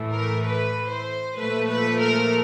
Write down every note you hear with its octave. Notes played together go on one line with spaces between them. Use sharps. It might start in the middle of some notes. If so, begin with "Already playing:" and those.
Already playing: A2 E3 A3
A#4
B4
C5
A#2 F3 A3 B4
B4
A#4